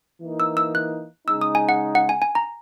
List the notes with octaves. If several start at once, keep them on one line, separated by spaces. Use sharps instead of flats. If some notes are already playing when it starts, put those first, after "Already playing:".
E3 A#3 D#4
E6
E6
F#6
C#3 G#3 D#4 E6
D#6
G#5
F#5
F#5
G#5
G#5
A#5